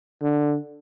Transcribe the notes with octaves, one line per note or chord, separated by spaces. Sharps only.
D3